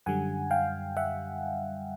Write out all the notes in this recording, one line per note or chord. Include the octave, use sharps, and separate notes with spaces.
F#2 D3 G3 F#5 G#5
F5 G5
E5 F#5